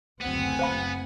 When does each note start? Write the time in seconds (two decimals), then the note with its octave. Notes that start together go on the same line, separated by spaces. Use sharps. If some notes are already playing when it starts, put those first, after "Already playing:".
0.21 F#1 D2 B3 C4 F#5 G#5
0.59 C5 F5 B5